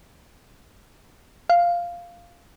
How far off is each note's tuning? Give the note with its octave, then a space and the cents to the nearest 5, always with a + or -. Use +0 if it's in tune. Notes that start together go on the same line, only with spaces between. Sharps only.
F5 -5